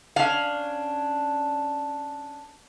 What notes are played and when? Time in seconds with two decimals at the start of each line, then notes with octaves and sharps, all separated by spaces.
0.16 C#4 D4 F5